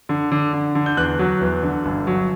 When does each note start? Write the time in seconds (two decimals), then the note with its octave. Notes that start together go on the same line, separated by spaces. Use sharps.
0.09 D3
0.32 D3
0.53 D3
0.75 D3
0.86 G6
0.97 E2 F#6
1.19 F#3
1.41 E2
1.63 D3
1.85 G1
2.07 F#3